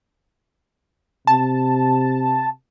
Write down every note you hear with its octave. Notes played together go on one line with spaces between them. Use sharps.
C3 A5